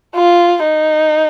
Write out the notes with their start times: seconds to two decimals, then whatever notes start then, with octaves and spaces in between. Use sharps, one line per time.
0.15 F4
0.63 D#4